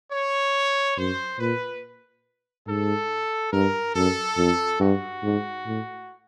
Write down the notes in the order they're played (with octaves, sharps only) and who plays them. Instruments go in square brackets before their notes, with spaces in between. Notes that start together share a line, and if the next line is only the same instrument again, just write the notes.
[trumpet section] C#5
[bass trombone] F#2 [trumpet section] C5
[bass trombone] A#2 [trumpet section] B4
[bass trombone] G#2 [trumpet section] A4
[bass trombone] G2 [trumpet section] A#4
[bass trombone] F#2 [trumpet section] A4
[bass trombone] F2
[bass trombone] G2 [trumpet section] F#4
[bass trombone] G#2
A2